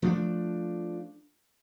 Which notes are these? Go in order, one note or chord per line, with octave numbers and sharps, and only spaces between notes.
F3 A3 C#4 D4